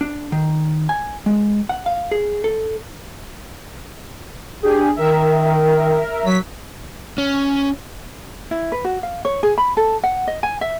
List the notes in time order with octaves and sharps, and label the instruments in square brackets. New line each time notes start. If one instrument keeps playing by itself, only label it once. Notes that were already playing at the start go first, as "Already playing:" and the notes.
[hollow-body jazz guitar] D4
D#3
G#5
G#3
F#5
F5
G#4
A4
[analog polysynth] D4 G#4 [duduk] G4
[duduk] D#3 [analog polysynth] A#4 E5
[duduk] F#3 [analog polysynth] B6
[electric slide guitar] C#4
[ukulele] E4
B4
F#4
F5
C#5
G#4
B5
A4
F#5
D#5
G#5
E5